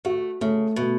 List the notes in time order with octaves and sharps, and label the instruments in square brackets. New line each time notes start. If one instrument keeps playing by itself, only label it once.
[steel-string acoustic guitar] A3 [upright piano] F#4
[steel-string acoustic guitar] C#3 [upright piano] A3
[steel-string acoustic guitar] B2 [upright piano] A3